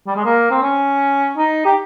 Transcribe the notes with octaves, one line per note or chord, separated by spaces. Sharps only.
G3
G#3
A#3
C4
C#4
D#4
G4